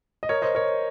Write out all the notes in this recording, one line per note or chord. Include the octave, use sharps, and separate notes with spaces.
D#5
A#4 C#5
C5 D#5
A#4 C#5